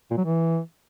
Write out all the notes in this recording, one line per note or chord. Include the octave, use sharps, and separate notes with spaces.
A#2
F#3
E3